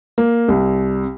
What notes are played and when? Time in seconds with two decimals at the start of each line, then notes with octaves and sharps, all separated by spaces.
0.18 A#3
0.49 C2